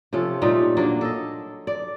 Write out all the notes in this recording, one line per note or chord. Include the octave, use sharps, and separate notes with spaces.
C3 F3 C#4 A4
A#2 G3 A3 D#4
F#3 A#3 D4
A4 D#5
D5